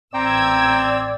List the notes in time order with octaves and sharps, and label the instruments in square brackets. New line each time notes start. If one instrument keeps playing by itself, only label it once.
[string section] A1 E6 G#6 [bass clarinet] C4 [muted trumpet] D5 [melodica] G5 A#5